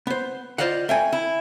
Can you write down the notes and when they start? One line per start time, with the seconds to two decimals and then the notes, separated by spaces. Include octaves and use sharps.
0.07 B3 C5
0.58 F4 C5 D5 D#5 F5 F#5
0.89 A3 G5 G#5
1.12 E4